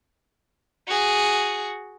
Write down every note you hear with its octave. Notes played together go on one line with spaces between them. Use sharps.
F#4 G#4